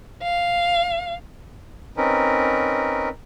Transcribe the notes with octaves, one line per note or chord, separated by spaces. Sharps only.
F5
C4 C#4 D#4 A#4 B4